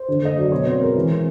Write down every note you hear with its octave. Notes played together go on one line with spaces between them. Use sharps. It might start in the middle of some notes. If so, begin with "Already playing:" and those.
Already playing: C5
D3
A3 D#5
F#3 D5
B2 C#5
C4 B4
G#3 A#4
E3
C4